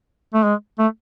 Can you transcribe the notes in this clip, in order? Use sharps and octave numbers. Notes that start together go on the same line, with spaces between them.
A3
G#3
A3